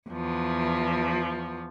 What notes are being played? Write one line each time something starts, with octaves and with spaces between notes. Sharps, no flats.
E2 F3